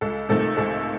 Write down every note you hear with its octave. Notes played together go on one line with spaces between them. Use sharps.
C#2 A4
C3 D#3 A3 A4
C#2 A4